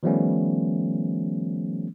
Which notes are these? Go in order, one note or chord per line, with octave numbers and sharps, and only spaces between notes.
D#3 F3 G3 A3 B3 C#4